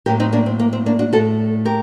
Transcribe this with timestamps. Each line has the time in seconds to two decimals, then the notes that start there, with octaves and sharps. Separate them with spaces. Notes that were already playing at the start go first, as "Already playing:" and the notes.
0.06 A2 F#3 A#3 G4 A#4
0.20 C4 D#4
0.33 A#3 D4
0.46 C4
0.59 A#3
0.73 C4
0.86 A#3 D4
0.99 D4 F#4
1.12 A2 A3 F#4 A4
1.65 G4 A#4